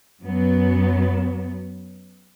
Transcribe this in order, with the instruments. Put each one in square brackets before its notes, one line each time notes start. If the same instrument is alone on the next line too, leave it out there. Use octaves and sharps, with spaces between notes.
[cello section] F#2 F#3 B3